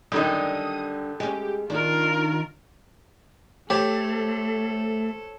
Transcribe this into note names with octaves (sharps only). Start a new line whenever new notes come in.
F#2 D3 D#3 G3 D#4 D#6
G#3 C#4 G4
D#3 D4 F4 A#4
A3 G4 A4 C5 C#5